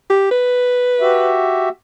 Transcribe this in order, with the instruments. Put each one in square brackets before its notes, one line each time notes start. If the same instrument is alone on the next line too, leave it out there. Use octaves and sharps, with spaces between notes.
[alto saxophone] G4
B4
[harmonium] F#4 G4 E5